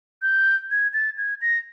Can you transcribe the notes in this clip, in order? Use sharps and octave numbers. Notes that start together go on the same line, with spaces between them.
G6
G#6
A6
G#6
A#6